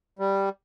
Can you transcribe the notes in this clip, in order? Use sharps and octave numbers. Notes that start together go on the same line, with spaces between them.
G3